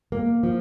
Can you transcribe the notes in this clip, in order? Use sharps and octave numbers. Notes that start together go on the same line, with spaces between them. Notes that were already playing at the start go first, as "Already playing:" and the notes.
A#3
F3